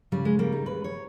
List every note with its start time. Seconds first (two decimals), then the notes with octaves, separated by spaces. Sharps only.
0.12 C#3 G3
0.25 G#3
0.39 G3 A#3
0.52 D#4
0.66 D#2 B4
0.84 C#5